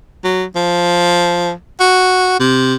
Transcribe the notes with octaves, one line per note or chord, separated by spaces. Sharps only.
F#3
F3
F#4
C3